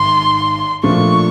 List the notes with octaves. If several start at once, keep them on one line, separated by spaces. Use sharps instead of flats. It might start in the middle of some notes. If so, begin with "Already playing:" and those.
Already playing: G#1 G#2 D#3 C6
A#2 F3 A3 D4 F4 C#6